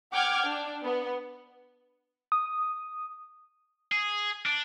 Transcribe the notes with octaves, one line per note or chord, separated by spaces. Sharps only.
F#5 G5 D6 F6 G#6
D4
B3
D#6
G#4
D4